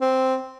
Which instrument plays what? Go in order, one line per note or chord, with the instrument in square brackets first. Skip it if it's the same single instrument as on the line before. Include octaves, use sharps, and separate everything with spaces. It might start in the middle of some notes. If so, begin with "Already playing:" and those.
[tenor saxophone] C4